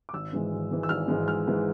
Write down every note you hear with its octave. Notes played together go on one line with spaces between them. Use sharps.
D6
G#1 E6
G#2 E3 G#3
G#1
G#2 E3 G#3
E6
G#1 F6
G#2 E3 G#3
G#1 F6
G#2 E3 G#3